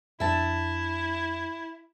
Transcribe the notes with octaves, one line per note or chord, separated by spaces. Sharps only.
F2 C4 D4 E4 E5 A5